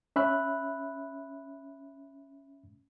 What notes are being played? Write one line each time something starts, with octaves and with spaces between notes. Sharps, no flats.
C#4 E5 B5 F#6